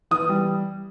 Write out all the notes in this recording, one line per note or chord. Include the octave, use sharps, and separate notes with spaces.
E3 D#6
G3